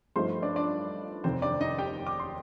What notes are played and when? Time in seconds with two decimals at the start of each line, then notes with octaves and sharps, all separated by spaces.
0.16 G2 F3 A3 D#4 C5 C6
0.42 D4 D5
0.56 D4 D5
1.24 F1 D#2 D#3 C4 C5
1.42 D4 D5
1.60 D#4 D#5
1.79 G4 G5
2.07 D6
2.20 C6